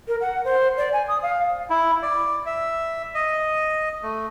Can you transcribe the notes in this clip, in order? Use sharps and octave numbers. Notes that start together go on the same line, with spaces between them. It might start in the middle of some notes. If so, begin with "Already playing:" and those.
A#4
F#5
C5
D5
G#5
D#6
F5
E4
D5
E5
D#5
A3